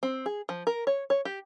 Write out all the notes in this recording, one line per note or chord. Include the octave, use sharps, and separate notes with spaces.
C4
G#4
F3
A#4
C#5
C#5
G4